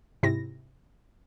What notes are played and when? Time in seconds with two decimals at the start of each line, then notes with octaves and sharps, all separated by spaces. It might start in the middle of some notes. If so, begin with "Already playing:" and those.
0.23 G#2 C3 E4 A#6